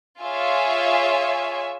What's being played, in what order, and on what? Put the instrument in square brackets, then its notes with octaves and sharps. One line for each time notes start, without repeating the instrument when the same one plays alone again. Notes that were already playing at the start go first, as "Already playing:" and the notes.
[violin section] F4 G#4 C#5 E5 G#5